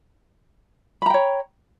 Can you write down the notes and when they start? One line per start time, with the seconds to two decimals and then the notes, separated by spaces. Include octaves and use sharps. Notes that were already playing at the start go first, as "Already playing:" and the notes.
1.02 B5
1.06 A#5
1.10 G5
1.14 C#5